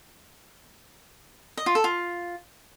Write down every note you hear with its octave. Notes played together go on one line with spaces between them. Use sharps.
D#5
F4
A4
F4